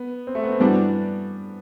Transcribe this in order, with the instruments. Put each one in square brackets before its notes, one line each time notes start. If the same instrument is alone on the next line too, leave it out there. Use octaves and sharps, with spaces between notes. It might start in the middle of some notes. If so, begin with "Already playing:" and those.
Already playing: [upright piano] B3
C4
A3
B3
C4
[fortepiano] E3 G3 D4 F#4 [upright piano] B3